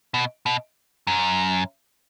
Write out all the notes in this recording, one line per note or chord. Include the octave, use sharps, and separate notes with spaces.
B2
B2
F#2